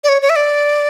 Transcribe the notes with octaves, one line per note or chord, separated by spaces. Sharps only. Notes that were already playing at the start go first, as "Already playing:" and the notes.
D5
C#5
C#5
E5
D5